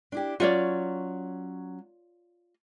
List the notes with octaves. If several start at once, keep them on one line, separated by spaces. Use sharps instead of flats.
D4 E4 G4
F#3 C#4 F4 C#5 D5